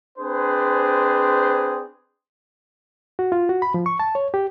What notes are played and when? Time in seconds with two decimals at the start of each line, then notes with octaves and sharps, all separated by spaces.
0.18 C4 D4 G#4 B4 C5
3.19 F#4
3.32 F4
3.49 F#4
3.62 B5
3.74 F3
3.86 C#6
4.00 A5
4.15 C#5
4.34 G4